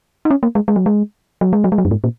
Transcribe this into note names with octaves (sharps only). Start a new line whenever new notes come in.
D#4
C#4
A#3
G#3
G#3
F#3
G#3
F#3
G#3
F#3
G#3
F#3
F#2
G#2
A#2